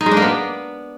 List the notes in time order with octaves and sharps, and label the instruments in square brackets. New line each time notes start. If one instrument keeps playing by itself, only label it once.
[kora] D#4
G#3
D4
A#3
B3